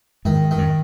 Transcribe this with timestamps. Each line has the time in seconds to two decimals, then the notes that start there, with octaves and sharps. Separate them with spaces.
0.25 G#2 D#3
0.51 D#3
0.58 F#2